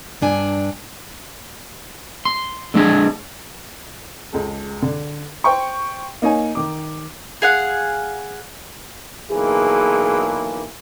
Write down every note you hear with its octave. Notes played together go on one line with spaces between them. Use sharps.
G2 D4 G#5
C6
D3 G#3 D4 G#4
C#2 G#3 A4
D3
C5 G5 C#6
A#3 D#4 C#5 G#5
D#3 D6
G#4 F5 F#5
B1 E3 A#3 G#4